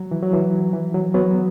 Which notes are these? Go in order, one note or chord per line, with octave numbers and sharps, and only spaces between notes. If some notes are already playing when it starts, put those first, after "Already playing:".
Already playing: F#3
E3
F#3
E3
E3
F#3
F#3 B3